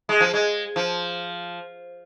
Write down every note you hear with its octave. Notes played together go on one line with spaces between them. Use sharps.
G#3
F3
G#3
F3